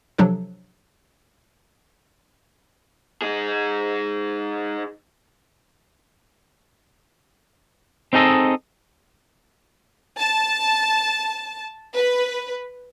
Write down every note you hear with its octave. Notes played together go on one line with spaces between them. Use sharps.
C3 F3 F#3 D4 A4
D#4 G#4
C4 D#4 G#4 A4 D#5
A5
B4